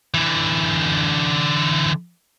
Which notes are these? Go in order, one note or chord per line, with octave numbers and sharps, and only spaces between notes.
D3 E3